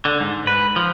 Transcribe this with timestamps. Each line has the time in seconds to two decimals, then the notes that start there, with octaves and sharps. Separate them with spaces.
0.05 D3
0.20 G#2
0.47 B4
0.76 F3